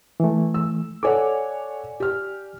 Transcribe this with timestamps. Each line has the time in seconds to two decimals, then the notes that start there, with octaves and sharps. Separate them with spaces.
0.20 E3 A3
0.54 E6
1.03 A4 C#5 D5 F#5 G#5 D6
2.00 G4 F6